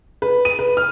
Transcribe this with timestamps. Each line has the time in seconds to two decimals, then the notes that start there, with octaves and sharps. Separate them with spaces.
0.22 B4
0.45 D#7
0.59 B4
0.77 F6